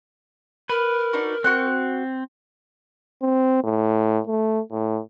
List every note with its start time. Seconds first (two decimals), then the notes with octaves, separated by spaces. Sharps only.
0.69 A#4 B4 B5
1.13 D4 D#4 F#4
1.44 C4 F#4 F#5 F#6
3.22 C4
3.64 A2
4.27 A3
4.71 A2